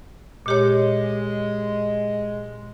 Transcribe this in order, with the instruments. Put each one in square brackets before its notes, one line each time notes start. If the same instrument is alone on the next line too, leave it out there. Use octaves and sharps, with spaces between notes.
[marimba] A#2 G4 C#5 [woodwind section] G#3